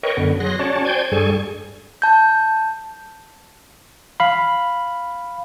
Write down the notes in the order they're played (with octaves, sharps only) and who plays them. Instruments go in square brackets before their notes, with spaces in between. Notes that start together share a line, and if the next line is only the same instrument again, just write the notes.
[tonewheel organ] A#4 B4 C#5 D#5 G5 C#6
F#2 D3 B3
F#3 G#4 C6 F#6 A#6
C#4 F#4 C#5 D5 A5
C5 D5 G5 G#5 G6 G#6
G2 G3 G#4 A4 G#5 C#6
[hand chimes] A5 G6
[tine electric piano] F5 B5